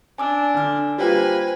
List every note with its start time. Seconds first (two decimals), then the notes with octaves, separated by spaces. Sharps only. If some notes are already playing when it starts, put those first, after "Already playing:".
0.18 D4 G#5 D6 E6
0.54 D3 F6
0.98 G3 A#3 F4 B4 C5 G5 G#5